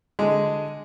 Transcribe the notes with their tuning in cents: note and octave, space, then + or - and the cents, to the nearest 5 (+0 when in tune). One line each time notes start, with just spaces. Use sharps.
D3 +0 G#3 +0